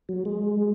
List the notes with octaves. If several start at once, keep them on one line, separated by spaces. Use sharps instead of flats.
F#3
G#3